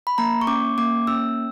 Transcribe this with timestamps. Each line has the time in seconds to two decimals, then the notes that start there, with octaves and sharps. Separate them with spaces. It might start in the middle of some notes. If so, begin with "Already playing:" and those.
0.07 B5
0.18 A#3 A#5
0.41 C#6
0.47 C#4 D6
0.78 A#3 D6
1.07 C#4 E6